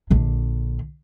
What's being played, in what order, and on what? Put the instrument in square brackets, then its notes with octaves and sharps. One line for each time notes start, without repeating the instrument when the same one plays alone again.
[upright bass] A#1 D3